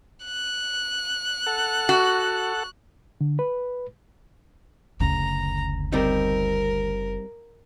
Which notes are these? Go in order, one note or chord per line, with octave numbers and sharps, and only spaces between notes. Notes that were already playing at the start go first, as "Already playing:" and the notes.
F#6
A4 F#5
F#4
D3
B4
F#1 D2 C#3 A#5
G3 C4 D#4 A#4